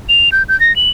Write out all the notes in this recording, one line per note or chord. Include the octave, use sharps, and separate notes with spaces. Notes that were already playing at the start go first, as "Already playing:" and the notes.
F7
G6
G6
A#6
F#7